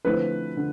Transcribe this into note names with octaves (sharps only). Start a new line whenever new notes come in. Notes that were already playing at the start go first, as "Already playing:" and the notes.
D3 F3 A3 C4 E4 B4
D3